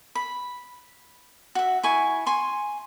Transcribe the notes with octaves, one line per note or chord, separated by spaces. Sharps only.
B5
F#4 E5
E4 G#5 C#6
G#5 C6 C#6